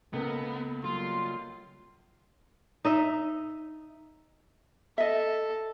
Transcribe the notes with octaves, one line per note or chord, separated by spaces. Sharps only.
C#2 A#3 B3 A4 A#4
F#3 G3 A#3 F4 C6
D#4 D#5 E5
A4 D#5 E5